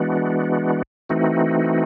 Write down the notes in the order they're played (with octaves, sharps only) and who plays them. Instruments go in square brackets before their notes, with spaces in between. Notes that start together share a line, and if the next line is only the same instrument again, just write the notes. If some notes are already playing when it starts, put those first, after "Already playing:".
Already playing: [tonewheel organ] E3 G#3 B3 D4 F#4
E3 A3 C4 D#4 F#4